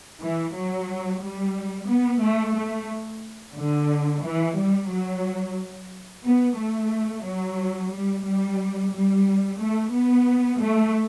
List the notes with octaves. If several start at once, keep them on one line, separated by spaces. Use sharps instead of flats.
E3
F#3
G3
B3
A3
A3
D3
E3
G3
F#3
B3
A3
F#3
G3
G3
G3
A3
B3
A3